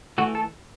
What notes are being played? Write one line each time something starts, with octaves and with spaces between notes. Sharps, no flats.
E3 A3 F#4
A4